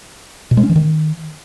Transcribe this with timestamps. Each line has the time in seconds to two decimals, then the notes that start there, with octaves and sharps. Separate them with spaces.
0.51 B2
0.57 G#3
0.63 C#4
0.69 E3
0.76 D#3